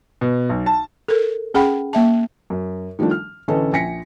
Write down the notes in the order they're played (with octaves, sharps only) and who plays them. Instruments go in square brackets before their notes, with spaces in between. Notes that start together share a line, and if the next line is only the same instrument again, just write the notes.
[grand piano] B2
B1
A5
[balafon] A4 A#4
C#4 G#4 F#5 G5 B5
A#3 E5 A5
[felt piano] F#2
D#3 F3 G3 A3 D4
F6
A1 D3 C#4 A4 B4 D#5
A#1 G#5 A#6 B6 C#7